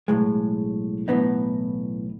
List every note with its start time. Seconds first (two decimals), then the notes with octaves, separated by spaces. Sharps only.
0.08 B1 A2 G#3
1.08 B1 A2 E3 B3 D#4